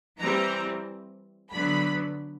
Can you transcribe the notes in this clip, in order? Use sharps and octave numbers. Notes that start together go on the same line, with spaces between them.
E3 G3 C4 A#5
D3 F#3 B3 B5